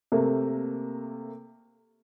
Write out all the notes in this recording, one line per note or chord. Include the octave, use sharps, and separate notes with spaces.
C3 A3 A#3